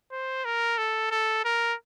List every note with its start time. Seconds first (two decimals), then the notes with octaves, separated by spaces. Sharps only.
0.12 C5
0.45 A#4
0.78 A4
1.11 A4
1.45 A#4